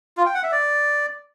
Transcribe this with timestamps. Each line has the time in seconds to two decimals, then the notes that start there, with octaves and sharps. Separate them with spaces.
0.17 F4
0.26 G5
0.35 F#5
0.43 E5
0.52 D5